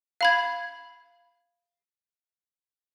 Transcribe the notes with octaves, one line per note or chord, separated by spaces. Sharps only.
F5 B5 G#6